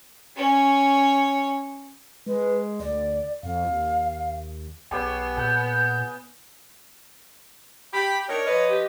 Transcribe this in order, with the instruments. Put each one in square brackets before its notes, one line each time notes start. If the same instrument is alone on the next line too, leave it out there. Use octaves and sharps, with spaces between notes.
[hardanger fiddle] C#4 C#5
[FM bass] G#3 [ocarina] B4
[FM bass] D2 [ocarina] D5
[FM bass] F2 [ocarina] F5
[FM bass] D#2
[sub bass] B1 [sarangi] B3 [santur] G4 G#4 C#5
[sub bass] A#2 [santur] G#4 F#5 [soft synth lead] G6
[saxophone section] G4 [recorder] B5
[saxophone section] D4 D#4 A#4 [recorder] C#5
[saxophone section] F3 B4 D#5
[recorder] G4